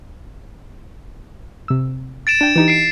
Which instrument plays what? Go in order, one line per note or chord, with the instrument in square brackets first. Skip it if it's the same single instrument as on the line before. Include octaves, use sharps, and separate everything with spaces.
[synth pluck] C3 E6
[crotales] A6 D7 E7
[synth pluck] D4 G5
E3 D#4 G4
[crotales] C7 D7